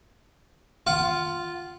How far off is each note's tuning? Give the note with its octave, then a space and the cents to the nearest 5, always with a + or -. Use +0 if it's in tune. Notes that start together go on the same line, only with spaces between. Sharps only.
F4 +0 F#5 +20